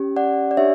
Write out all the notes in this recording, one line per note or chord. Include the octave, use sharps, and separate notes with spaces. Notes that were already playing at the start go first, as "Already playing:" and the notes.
Already playing: C#4 G4
D5 F#5
D5
D4 G4 C#5 E5